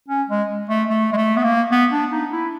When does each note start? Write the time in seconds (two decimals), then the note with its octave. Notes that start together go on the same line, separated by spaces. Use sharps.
0.09 C#4
0.29 G#3
0.70 A3
0.89 A3
1.13 G#3
1.17 A3
1.37 B3
1.44 A#3
1.72 B3
1.91 D4
2.12 D#4
2.32 E4